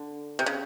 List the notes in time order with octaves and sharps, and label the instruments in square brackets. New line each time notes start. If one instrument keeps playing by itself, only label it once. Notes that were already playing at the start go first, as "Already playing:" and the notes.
Already playing: [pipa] D3
C3
C#3